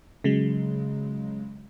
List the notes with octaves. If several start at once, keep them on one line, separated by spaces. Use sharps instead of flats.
C#3 F#3 G#3